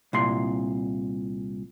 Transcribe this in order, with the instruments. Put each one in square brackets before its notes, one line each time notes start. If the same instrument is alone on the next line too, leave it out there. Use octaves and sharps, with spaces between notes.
[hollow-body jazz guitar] C2 A#2 C6